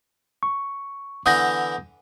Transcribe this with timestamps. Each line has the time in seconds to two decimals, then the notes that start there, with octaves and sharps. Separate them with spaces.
0.43 C#6
1.26 D3 E3 B3 D#6 G6 A#6